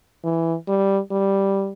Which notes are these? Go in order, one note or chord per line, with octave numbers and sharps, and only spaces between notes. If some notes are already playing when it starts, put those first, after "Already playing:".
E3
G3
G3